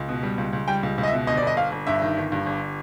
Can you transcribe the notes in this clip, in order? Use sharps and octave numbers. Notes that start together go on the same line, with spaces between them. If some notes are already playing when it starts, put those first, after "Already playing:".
Already playing: C#2
B2
G3
C#2
C#2
G3 G5
C#2
C#2
D#5
E5
B2
G1 D#5
D5
G1 D#5
G1 F5
G1
G2 E5
D#3
G1
G2
G1